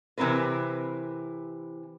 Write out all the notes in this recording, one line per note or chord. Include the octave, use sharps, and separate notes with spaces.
C3 E3 F#3 C4 A#4 B4